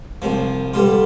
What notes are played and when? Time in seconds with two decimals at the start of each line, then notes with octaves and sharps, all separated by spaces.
0.22 C2 C3 F3
0.74 G2 D3 G3 F4